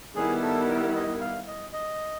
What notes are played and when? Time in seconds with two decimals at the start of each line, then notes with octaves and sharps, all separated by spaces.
0.16 D#3 G3 B3 E4 G#4
0.42 A4
0.68 A#4
0.94 D#5
1.21 F5
1.47 D#5
1.73 D#5